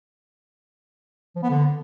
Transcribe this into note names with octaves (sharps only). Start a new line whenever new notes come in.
F3
B3
D3